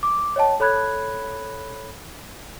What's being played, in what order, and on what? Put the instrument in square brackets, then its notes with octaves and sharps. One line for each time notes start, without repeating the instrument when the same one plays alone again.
[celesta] D6
C#5 D#5 G5 A5
A4 C#5 B5 F#6 G#6